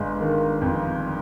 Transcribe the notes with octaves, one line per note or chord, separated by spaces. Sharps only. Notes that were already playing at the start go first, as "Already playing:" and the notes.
Already playing: G1 G#3
D#3
F2